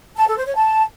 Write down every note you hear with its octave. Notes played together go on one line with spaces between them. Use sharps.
A5
A4
C5
C#5
A5